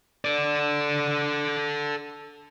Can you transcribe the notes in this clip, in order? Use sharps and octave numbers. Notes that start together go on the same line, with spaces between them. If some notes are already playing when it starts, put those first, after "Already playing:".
A4 D5